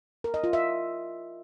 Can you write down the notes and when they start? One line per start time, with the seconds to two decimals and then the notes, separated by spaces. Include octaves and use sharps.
0.24 A#4
0.34 D#5
0.44 F4
0.53 E5